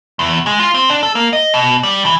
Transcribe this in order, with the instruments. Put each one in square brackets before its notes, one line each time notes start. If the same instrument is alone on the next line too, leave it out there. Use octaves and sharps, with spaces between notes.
[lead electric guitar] E2
G#3
F4
C4
D4
A4
A#3
D#5
B2
G3
E3